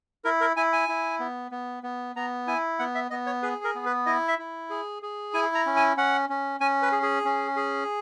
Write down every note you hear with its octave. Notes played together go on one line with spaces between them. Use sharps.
E4 A#4
A#4
E4 G#5
G#5
E4
B3
B3
B3
B3 A#5
E4 G#5
B3 F#5
E5
B3 D#5
C#5
G#4 B4
A#4
B3
B4
E4 D#5
E5
E4
G#4
G#4
E4 G#5
A#5
C#4
G#5
C#4 F#5
C#4
C#4 G#5
B4
G#4
G#4
C#4
G#4